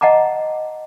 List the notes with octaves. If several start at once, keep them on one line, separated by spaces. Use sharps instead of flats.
D#5 F#5 A5 A#5 D6